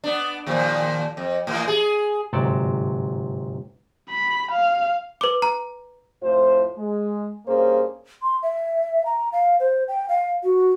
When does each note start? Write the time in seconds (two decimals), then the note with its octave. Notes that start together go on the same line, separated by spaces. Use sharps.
0.04 B3 D4
0.46 D#2 A#2 F3
1.17 F2
1.47 A2 E3
1.68 G#4
2.33 G1 G#2 C3 F#3 A4 D5
4.09 B5
4.51 F5
5.21 B4 D6
5.42 A#5
6.23 F2 A2 F4 C5
6.78 G#3
7.47 G2 A#3 C#4 G#4 C5
8.22 C6
8.43 E5
9.06 A#5
9.32 F5
9.60 C5
9.88 G5
10.09 F5
10.43 F#4